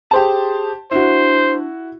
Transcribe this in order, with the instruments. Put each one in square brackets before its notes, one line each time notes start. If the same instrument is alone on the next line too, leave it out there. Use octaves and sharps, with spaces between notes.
[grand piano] G4 C5 A5 [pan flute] G#4
[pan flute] D4 [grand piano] E4 F#4 [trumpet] C5